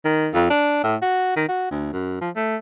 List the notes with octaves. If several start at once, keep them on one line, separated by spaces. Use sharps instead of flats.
D#3
F2
D4
A2
F#4
D#3
F#4
D2
F#2
F3
A3